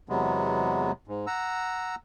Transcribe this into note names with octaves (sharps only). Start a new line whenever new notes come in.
E2 C3 F#3 G#3 B3
G#2
F#5 A#5 E6